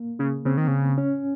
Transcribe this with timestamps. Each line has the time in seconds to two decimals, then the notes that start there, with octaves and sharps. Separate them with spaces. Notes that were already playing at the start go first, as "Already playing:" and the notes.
Already playing: A#3
0.19 C#3
0.45 C#3 C4
0.57 D#3
0.68 C#3
0.98 C#4